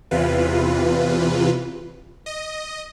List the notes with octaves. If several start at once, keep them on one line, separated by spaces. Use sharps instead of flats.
E2 C3 E3 F4 B4
D#5